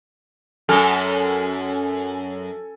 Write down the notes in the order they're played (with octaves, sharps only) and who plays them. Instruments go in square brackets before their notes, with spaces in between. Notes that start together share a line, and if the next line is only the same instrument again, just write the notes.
[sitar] F#2 [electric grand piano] A4 G#5 F6